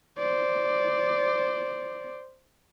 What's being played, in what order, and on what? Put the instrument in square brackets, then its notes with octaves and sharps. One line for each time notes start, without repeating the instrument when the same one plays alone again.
[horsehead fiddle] C5 D5